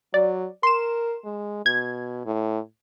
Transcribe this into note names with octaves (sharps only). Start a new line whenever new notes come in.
F#3 D5
A#4 C6 E7
G#3
B2 G#6
A2